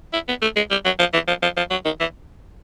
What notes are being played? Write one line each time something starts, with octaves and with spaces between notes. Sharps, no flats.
E4
B3
A3
G#3
G3
F#3
F3
E3
F3
F3
F3
F#3
D#3
E3